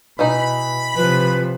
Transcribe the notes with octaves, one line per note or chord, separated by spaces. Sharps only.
B2 E3 D#4 B5
C3 F3 B4